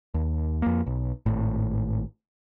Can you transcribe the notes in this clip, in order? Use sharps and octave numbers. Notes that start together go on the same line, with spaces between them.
D#2
F2 A#3
B1
G#1 A2